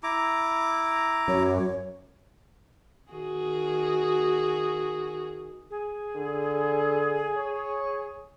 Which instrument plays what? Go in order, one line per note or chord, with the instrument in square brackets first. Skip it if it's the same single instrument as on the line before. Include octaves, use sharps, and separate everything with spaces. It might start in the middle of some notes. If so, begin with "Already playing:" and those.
[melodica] E4 A#5 D6
[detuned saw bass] F#2 [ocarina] C#5
[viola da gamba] D#3 F#4 G#4
[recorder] G#4
[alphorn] D3
C#5